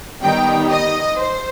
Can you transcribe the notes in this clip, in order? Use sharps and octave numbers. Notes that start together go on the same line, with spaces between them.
D#3 G3 B3 D#4 G5
D#5
C5